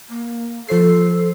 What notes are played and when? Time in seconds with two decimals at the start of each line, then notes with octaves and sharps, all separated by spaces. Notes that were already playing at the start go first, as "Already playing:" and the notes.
0.09 A#3
0.69 F3 A4 C5 C7